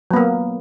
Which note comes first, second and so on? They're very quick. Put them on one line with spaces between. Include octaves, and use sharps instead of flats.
F#3 B3 A#3